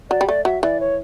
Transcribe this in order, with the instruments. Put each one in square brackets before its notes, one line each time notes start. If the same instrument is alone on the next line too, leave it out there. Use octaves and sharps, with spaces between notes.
[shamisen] F#3 [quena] D5
[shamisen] G3
[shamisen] A3 [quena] D5
[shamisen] F#3 [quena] E5
[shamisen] E3 [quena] D5
[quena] C#5